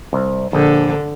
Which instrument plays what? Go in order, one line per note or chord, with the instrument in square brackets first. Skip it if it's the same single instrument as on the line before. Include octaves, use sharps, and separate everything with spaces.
[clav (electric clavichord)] C2
[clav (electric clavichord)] A#1 [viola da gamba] D3